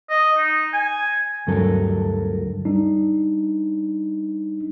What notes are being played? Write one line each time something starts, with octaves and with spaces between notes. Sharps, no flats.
D#5
D#4
G#5
D2 G2 F#3 A4 A#4
G3 D4 D#4